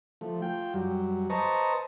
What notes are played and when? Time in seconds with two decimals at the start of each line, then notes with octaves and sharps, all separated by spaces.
0.21 F3 A3
0.42 F4 G5
0.74 F#2 F#3 G3
1.30 B4 C5 D#5 A5 A#5 C#6